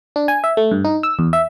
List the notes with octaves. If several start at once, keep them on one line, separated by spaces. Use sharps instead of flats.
D4
G#5
E5
A3
G2
D#4
E6
E2
E5